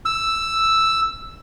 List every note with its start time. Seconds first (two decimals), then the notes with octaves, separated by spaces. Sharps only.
0.05 E6